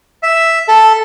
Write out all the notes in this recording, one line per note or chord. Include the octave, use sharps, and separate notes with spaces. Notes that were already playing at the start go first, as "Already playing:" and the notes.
E5
A4